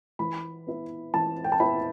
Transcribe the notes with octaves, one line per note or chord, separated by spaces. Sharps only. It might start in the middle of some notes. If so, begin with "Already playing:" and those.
E3 B5
B3 E4
E3 A5
G5
A5
B3 E4 B5